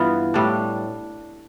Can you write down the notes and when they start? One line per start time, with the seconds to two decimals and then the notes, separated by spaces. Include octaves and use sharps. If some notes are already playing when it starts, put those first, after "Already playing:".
Already playing: G2 E3 B3 F4
0.34 A2 G3 D4